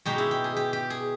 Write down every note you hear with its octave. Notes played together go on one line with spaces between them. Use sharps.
B2 G#3 D#4 G4
E4
G4
G#4
G4
G4
G#4